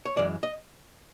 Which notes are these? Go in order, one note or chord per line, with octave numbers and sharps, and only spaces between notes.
C#5
F#2 C#3 E3 G#3 D5
D#5